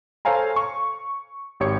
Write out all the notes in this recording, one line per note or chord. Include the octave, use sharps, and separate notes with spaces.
A4 C5 C#5 F5 G#5 A#5
C#6
G#1 G4 C#5 C#7